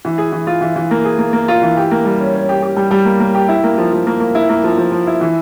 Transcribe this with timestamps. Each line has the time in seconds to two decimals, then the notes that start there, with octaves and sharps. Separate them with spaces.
0.05 E3
0.18 G#4
0.32 E3
0.47 F4
0.61 E3
0.76 E3
0.91 A#3
1.05 G#4
1.19 A#3
1.33 A#3
1.48 F4
1.62 E3
1.77 G4
1.91 A#3
2.05 G3
2.20 C#4
2.35 C#4
2.49 G4
2.62 G4
2.76 G3
2.91 G3
3.05 A#3
3.20 A#3
3.35 G4
3.49 E4
3.64 A#3
3.77 F3
3.93 F3
4.07 A#3
4.20 A#3
4.35 E4
4.49 A#3
4.64 F3
4.78 F3
4.92 F3
5.07 E4
5.21 E3